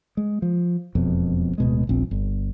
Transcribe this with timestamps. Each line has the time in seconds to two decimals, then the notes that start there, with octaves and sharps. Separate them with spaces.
0.17 G#3
0.42 F3
0.95 E1 F2 B2
1.58 D1 B2 G#3
1.87 D#1 A#1 C4
2.11 G1